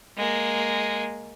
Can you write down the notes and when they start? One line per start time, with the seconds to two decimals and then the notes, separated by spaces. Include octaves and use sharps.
0.17 G#3 A#3